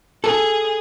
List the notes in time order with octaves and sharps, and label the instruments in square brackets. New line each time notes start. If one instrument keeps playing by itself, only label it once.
[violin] G#4 [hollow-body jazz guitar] A4